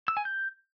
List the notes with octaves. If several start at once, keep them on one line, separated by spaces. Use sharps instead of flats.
E6
G#5
G6